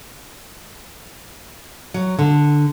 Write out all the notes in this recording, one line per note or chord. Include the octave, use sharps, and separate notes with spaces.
F#3
D3